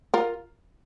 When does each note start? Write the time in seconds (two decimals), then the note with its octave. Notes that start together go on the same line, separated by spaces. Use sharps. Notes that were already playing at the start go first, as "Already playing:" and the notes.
0.14 F4 A#4